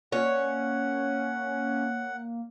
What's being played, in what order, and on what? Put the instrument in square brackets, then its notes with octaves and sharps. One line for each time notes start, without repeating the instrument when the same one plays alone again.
[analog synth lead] A#3 [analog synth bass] C#4 [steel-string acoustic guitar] C#5 [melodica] F#5